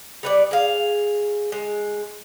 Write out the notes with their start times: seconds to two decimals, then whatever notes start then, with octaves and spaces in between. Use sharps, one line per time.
0.23 G3 B3 D5
0.51 G#4 F5
1.52 G#3